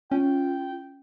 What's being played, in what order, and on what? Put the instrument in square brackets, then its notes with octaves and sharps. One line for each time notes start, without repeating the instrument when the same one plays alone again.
[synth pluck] C#4 [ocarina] F4 [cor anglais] G5